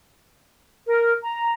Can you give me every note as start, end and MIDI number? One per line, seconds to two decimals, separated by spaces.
0.87 1.14 70
1.23 1.53 82